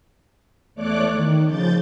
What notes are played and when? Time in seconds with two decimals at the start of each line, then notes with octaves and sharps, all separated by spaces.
0.75 E2 A3 C#5 D5 D6 F#6
1.13 D#3
1.46 C#3 F3 G6 A6